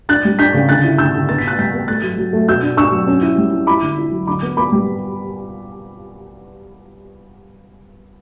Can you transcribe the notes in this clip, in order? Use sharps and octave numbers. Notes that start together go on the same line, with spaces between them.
D4 F#6 A6
G3
D4 G6 B6
C#3
D3 F#6 A6
E4
D3 E6 G6
D3
B3 A6
B6
B3 F#6 A6
G3 G6 B6
B3
A3 F#6 A6
F#3
F#3
A3
B2 E6 G6
D4
D4 C#6 E6
F#3
C#4
E4
G3
E4
E4 B5 D6
D3
E4
F#3
D3 B5 D6
B3
B3 B5 D6
G3